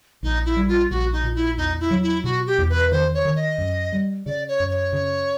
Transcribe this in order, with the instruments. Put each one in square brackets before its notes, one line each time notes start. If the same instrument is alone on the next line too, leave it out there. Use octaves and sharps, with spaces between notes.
[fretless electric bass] A#1 [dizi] D#4
[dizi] E4
[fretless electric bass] G3
[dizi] F4
[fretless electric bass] A#1 [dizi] F#4
[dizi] D#4
[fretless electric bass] A#2
[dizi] E4
[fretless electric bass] E2 [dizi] D#4
[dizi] E4
[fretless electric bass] F#3
[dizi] E4
[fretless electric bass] B2 [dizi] F#4
[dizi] G4
[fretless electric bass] E2
[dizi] B4
[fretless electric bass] D#3 [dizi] C5
[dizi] C#5
[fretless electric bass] D#3
[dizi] D#5
[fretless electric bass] F#2
G3
[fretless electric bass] C#3 [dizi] D5
[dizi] C#5
[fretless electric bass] F#2
[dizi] C#5
[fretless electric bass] C#3